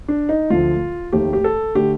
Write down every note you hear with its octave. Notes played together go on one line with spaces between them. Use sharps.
D4
D#4
D2 D3 F3 F4
F1 D#2 D#3 A3 G4
G4
A4
D3 A3 G4